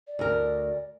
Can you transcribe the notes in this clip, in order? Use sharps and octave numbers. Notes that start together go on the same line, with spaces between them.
D5
D2 A#4